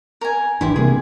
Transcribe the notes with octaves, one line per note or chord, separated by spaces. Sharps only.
A#4 G#5
G#1 E3 D4 E4 G4 C6
C3 G3 A#3 G#4